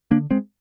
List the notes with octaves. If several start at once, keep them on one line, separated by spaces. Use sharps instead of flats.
D3 A#3 D4
G#3 C4